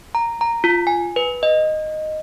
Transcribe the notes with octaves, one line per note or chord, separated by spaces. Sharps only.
A#5
A#5
F4
G#5
B4
D#5